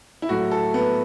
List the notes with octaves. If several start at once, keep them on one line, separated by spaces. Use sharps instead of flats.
E4
A2 F#3 A3 F#4
A4
B3